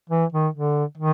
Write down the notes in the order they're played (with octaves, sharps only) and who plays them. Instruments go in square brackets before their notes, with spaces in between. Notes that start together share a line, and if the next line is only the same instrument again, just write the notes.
[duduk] E3
D#3
D3
D#3